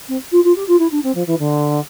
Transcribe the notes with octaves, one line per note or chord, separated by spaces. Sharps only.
C4
F4
F4
G4
F4
E4
D4
C4
F3
E3
D3